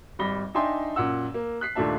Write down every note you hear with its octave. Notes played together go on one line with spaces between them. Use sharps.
G#1 G3 B5 A#6 G7
D4 D#4 E5 G5 G#5 C6
F#2 A#2 F#5 E6
A#3
F#6 B6 C7
D#2 A#2 A3 D4 E5 A5